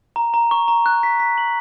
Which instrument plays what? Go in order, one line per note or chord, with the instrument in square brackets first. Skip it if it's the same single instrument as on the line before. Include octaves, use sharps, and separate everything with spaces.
[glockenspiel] A#5
A#5
C#6
A#5
F#6
B6
B6
F#7